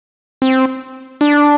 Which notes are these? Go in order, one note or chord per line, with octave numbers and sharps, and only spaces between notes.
C4
D4